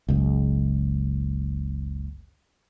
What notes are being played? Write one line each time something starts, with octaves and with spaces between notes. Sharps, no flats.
F#1 C#2